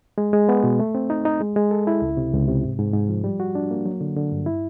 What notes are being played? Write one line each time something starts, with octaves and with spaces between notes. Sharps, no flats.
G#3
G#3
B3
B2
A3
C4
D#4
D#4
G#3
G#3
A4
E4
C#2
C3
C#2
C3
G#2
G#2
G#2
F3
G3
F#4
D4
A#3
F#3
D3
D3
G2
E4